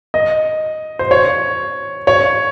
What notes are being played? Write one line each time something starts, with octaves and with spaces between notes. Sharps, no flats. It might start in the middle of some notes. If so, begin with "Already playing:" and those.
D#5
C5
C#5
C#5